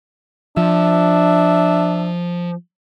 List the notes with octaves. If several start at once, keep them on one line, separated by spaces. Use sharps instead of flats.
F3 D4 E5